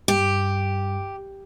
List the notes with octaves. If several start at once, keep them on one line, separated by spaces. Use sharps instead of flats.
G2 G4